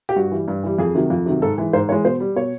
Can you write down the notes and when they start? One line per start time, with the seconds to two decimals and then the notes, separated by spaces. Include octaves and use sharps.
0.09 G4
0.16 G2 F#4
0.31 E3 G3
0.48 G2
0.63 E3 G3
0.79 F2 G#4
0.95 C3 D#3 F#3
1.10 F2
1.26 C3 D#3 F#3
1.42 G#2 A4
1.58 E3 G#3
1.73 G#2 C5
1.89 E3 G#3 C#5
2.05 B2 C5
2.20 G3
2.36 B2 C#5